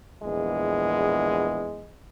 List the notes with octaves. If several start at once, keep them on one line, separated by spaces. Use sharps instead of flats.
A#1 E2 G#3